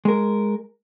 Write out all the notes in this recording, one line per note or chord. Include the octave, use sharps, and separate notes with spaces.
G#3 A#4